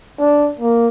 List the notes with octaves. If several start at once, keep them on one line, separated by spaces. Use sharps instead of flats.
D4
A#3